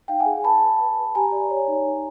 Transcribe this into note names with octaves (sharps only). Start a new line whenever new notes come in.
D#4 F5 G5
F#5 G#5
G#4
B4 A5 B5
B4
B4
B4
G4 G#5 A#5
D5
C#5
D#4
D#4